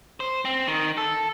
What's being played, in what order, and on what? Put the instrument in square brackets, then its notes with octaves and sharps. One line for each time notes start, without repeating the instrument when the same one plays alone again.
[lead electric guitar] C5
C4
D#3
A4